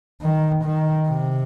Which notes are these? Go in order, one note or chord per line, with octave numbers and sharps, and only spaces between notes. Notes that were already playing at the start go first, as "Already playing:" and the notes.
D#3
D#3
C3